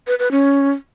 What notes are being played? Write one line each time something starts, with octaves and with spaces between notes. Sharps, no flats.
B4
B4
C#4